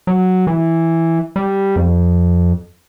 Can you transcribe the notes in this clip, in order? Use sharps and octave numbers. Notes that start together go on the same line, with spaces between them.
F#3
E3
G3
F2